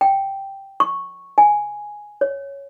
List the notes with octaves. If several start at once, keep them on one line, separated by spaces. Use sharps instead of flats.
G5
C#6
G#5
C#5